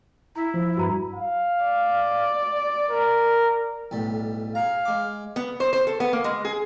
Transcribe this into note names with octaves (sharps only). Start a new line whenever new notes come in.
E4 A#5
F3
G2 F#4 A#5 B5
F5
D5
A#4
B1 A2 G3
G#4 F5 A#5
G#3 D6
B3
C5
C5
A4
B3
A#3
G#3
G#4